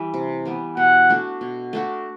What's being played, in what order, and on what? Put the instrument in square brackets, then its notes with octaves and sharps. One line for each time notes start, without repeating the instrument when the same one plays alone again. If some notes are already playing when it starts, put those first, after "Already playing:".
Already playing: [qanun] E3 G3
C3
E3 G3 B3
[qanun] B2 [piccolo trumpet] F#5
[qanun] A3 D4 F#4
B2
A3 D4 F#4